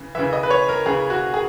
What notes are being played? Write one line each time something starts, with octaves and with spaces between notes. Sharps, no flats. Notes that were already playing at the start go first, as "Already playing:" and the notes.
Already playing: C#3 E3
C#3 E3 E5
D#5
B4
C#5
A#4
C#3 E3 G#4
F#4
G#4